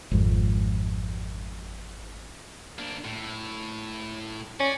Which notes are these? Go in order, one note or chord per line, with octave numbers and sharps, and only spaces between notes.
G#1 F2 G#2
A#3 D4
A2
C#4 D5